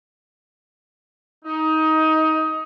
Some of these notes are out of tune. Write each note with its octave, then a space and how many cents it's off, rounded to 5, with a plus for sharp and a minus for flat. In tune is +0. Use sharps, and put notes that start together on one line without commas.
D#4 +20